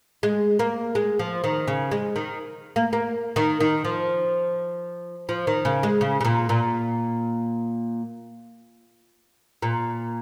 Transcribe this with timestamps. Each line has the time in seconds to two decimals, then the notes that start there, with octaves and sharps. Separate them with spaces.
0.23 G#3
0.59 A#3
0.95 G#3
1.19 F3
1.44 D#3
1.68 C#3
1.91 G#3
2.16 D#3
2.76 A#3
2.93 A#3
3.36 D#3
3.60 D#3
3.85 F3
5.29 F3
5.47 D#3
5.65 C#3
5.83 G#3
6.01 C#3
6.21 C#3
6.25 A#2
6.49 A#2
9.62 A#2